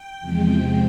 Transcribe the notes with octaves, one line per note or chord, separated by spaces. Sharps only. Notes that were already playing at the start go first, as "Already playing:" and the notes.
Already playing: G5
E2 C3 F3 G#3